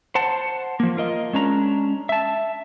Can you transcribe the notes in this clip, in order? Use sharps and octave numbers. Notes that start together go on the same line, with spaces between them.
C5 F#5 A5
F3 A#3
F4 A#4 D#5
G#3 C#4 D4 A#5
E5 A5